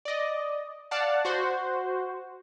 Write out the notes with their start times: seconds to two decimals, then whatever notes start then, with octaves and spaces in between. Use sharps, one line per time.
0.05 D5 D#5
0.91 D5 F5 F#5 A5
1.25 F#4 C5